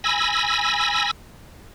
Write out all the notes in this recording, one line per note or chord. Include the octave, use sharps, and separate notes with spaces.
G#5 B5 E6 A#6